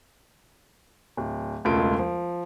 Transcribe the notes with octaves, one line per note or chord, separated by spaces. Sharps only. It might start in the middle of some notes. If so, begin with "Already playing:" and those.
D1
E1 C#2 A3 F4 D7
F3